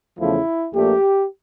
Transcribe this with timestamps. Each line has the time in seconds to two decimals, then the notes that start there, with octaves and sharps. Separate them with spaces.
0.19 E2 C#3 F3 A3 E4
0.74 A#1 A#2 A3 G4